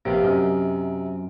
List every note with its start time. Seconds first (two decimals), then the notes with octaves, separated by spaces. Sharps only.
0.05 A#1 C3 B3 F5
0.24 F#2 D#5